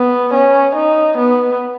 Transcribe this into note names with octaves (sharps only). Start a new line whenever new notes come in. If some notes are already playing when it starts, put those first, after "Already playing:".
Already playing: B3
C#4
D#4
B3